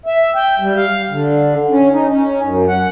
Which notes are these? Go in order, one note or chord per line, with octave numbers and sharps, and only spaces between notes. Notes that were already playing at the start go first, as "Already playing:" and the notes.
E5
G5
G3
F5
D3
C#4
D#4
C#4
F#2
F#5